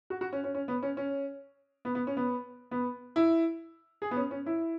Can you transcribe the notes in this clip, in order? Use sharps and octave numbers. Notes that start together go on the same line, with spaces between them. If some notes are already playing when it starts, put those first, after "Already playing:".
F#4
F#4
C#4
C#4
C#4
B3
C#4
C#4
B3
B3
C#4
B3
B3
E4
G#4
B3
C#4
C#4
E4